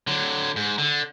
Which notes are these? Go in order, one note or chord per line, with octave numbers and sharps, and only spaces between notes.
D3 F#3
G#2
D3